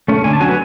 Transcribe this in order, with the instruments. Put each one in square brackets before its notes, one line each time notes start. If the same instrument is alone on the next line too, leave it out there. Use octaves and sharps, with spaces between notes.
[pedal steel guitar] A3 C#4
D3 G#5
A5
F#3 C#4 G#5
B4